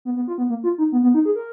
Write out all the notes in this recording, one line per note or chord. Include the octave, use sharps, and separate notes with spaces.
B3
B3
F4
B3
A#3
F4
D#4
B3
B3
D#4
G#4
A#4